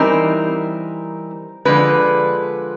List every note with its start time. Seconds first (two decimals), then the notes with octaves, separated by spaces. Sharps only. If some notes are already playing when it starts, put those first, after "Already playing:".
Already playing: E3 G3 C4 D#4 A#4
1.65 D3 F3 G#3 B4